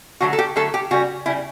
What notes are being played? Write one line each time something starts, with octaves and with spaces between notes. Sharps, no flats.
D3 F#3 A3 F#4
A4
G4
D3 F#3 A3 A4
G4
C#3 G3 F#4
C#3 G3 E4